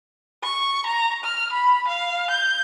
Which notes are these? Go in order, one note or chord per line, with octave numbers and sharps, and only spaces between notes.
C#6
A#5
F6
B5
F5
G6